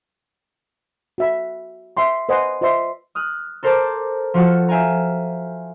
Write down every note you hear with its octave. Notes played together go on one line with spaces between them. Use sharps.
F#4 E5 B5
E5 G5 C6 C#6
B4 C5 D#5 F#5 G#5 C6
F4 C5 D#5 E5 C6
D#6 F6 F#6
A4 A#4 C5 A5 A#5 D6
F3 F4 F#4 A4
E5 F5 G5 G#5 A#5